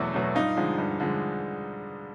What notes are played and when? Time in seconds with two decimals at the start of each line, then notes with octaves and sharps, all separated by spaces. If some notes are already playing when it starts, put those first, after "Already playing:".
Already playing: E2 B2 F#3 A3 E4
0.14 B2 F#3 A3
0.35 G2 D#4 F4
0.57 D3 F3 G#3
0.78 G2
1.00 D3 F3 G#3